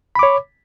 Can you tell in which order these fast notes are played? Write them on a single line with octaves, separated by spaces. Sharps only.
B5 D6 C#5